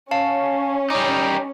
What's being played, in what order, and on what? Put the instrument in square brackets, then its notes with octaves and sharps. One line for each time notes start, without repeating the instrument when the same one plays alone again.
[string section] C#4 [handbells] F5 A5
[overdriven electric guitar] G3 D#4 [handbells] D6